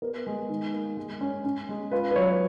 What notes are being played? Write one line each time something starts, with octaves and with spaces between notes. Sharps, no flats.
B3 A#4
G#3
D#3
A#3
G#3
C#4
C#4
G#3
F4 B4
B4
F#3 C#5